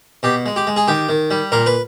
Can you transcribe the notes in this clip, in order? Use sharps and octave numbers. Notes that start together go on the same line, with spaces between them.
B2 G4
G#3
G4
G#3
G#4
D#3 G4
D#3
G3
A#2 A#4
B4